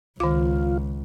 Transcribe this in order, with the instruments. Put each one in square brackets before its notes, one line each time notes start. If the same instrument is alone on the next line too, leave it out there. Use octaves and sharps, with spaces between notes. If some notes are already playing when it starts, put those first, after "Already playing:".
[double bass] C#2 [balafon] D#3 D6 [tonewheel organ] F4